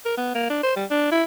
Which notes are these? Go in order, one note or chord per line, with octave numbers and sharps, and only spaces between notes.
A#4
B3
A#3
D4
C5
G3
D4
E4